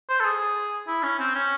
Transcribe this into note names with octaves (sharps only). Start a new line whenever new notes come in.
C5
A4
G#4
E4
C#4
C4
C#4